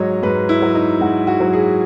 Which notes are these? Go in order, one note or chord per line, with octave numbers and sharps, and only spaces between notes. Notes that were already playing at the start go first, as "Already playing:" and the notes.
Already playing: G#2 F#3 C#5 D#5
G#2 B4
E4
F#3
D#4
G#2 F#4
F#4
F#3
G#4